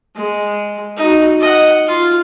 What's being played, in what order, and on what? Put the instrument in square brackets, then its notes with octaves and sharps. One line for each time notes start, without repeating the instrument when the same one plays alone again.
[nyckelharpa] G#3
D#4 F#4
D#5 F#5
F4